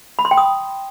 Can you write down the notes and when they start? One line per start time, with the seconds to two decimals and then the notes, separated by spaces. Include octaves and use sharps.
0.19 B5
0.25 C6
0.31 G5
0.37 D#6